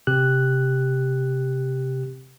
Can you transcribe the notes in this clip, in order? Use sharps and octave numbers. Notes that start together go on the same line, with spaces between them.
C3 G4 F#6